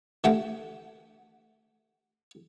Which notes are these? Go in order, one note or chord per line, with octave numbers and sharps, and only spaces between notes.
D3 A3 G4 F#5 G5